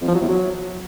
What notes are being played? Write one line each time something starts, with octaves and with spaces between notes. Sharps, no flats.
F2
F3
F#3
E2
F#3